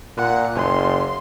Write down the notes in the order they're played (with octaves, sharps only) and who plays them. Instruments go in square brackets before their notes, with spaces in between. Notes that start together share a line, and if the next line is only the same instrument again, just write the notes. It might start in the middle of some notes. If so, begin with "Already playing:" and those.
[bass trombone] A#2 [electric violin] F#5
[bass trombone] F#1 [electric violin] C6